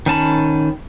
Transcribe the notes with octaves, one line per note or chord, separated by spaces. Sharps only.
D#3 C#4 A5 B5